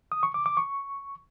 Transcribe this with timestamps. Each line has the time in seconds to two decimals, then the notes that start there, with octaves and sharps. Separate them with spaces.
0.12 D#6
0.23 C#6
0.34 D6
0.46 D6
0.57 C#6